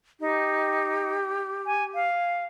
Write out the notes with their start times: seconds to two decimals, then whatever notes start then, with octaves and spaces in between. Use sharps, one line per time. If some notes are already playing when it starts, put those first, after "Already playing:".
0.20 D#4 G4
1.66 G#5
1.95 F5